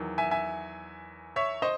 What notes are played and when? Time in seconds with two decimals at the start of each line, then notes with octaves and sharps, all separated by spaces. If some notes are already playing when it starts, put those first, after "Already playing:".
Already playing: E2 D#3 F#3
0.18 E5 G#5
0.31 E5 G#5
1.36 C#5 E5
1.62 C5 D#5